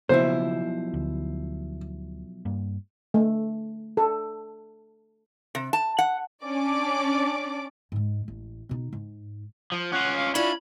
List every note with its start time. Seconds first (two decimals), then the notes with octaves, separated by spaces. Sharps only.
0.09 B1 C#3 F3 A#3 B3 E4 C5
0.94 D2
2.45 G2 A#3
3.14 A3
3.97 A4
5.55 C3
5.73 A5
5.98 F#5
6.45 C#4 D4 D5 D6
7.92 G#2 G#3
8.28 A1
8.69 B2 D#4
8.93 G#2
9.72 F3
9.92 C#4 F4 F#5
10.16 F5
10.35 C#4 D4 E4 F4 B5